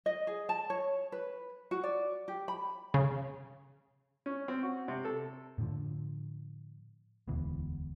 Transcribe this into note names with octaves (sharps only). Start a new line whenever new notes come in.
D#5
G#4
A5
C#5
B4
F#4
D5
G4
B5
C#3
C#4
C4
F#4
C3
A4
A2 D3 F3
E1 D2 B2 E3